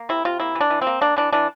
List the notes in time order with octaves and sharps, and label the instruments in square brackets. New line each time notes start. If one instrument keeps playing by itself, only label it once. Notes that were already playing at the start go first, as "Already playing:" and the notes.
Already playing: [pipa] A#3
C3 E4
C3 F4
A#3 E4
E3
D4
E3
C4
A#3
A#3 D4
E3 D4
E3 D4